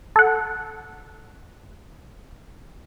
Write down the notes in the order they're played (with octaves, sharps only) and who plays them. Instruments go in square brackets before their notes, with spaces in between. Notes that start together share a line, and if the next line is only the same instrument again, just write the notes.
[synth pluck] A4 F#5